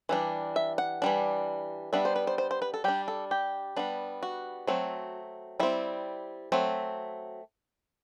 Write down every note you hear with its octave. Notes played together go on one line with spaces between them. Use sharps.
E3 G3 D4
E5
F#5
E3 G3 D4
G3 B3 D4 E5
C5
B4
C5
C5
C5
B4
A4
G3 D4 G4
A4
G4
G3 B3 D4
F#4
F#3 A3 C4
G3 C4 E4
F#3 A3 C4